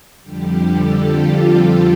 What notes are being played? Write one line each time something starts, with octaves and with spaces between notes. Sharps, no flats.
F2 D3 G3 G4
A4
F4